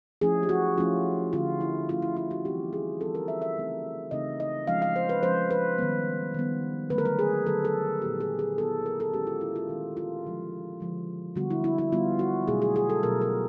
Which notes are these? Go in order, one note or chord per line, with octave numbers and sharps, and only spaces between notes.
F3 A3 C#4 E4 G#4
G4
F#4
F3 A3 C#4 E4 F4
D3 F3 A3 C#4 E4 F4
E4
D3 F3 A3 C#4 E4 F4
E4
F4
F#4
E3 G3 C4 G4
G#4
E3 G3 C4 A4
A#4
E5
E5
C#3 E3 A3 C4 D#4
C#3 E3 A3 C4 D#4 D#5
D#5
F3 G#3 C#4 F5
F5
C5
B4
F3 G#3 C#4 C5
B4
D#3 G3 B3
D#3 G3 B3
D3 F#3 A3 B4
A#4
B4
G#4
D3 F#3 A3 A4
A4
A#2 F#3 B3 E4 G4
G#4
G#4
A#2 F#3 B3 E4 A4
A#4
A4
D#3 G#3 C#4 G4
F4
E4
F4
D#3 G#3 C#4
F4
D3 F3 G#3
D3 F3 G#3
D3 G3 B3 F#4
E4
E4
E4
D3 G3 B3 F4
F#4
B2 F#3 A3 G#4
G#4
G#4
A4
B2 F#3 A3 A#4
A#4